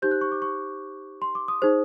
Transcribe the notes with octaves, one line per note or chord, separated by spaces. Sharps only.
D#4 G4 C5 G6
F#6
C#6
D6
C#6
C6
D6
D#6
D#4 G#4 C5